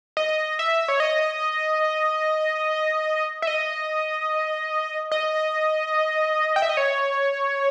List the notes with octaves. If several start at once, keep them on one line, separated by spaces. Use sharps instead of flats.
D#5
E5
C#5
D#5
E5
D#5
D#5
G5
E5
D#5
C#5